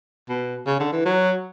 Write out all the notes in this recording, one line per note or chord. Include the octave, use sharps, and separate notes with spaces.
B2
C#3
D3
E3
F#3